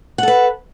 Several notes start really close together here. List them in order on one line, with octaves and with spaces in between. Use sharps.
F#5 A4 B4